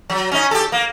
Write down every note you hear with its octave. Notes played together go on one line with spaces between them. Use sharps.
F#3
C#4 D#4
G4 A4
A#3